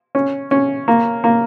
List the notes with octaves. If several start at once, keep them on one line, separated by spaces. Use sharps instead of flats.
C#4
C#4
A#3
A#3